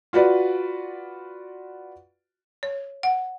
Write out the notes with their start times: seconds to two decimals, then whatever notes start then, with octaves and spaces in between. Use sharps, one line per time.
0.13 F4 F#4 B4 D5
2.63 C#5
3.03 F#5